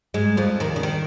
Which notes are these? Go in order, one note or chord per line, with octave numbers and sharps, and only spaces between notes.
G#2 G#3
F2 F3
D#2 D#3
C#3
D#3